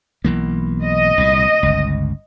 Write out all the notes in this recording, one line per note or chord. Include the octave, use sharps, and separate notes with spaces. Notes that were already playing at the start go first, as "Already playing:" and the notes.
B1 E3 A#3
D#5
C2 A#2
G1 C#2